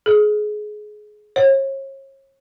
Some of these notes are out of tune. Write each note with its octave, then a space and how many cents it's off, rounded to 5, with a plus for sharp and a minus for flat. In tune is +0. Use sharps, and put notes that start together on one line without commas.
G#4 +20
C#5 -40